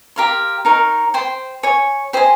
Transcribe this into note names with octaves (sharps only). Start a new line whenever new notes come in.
G4 A#4 F5 C6
D#4 A#4 C#5
C5 G5 C6
C#5 G#5 C#6
G4 C5 D#5 G#5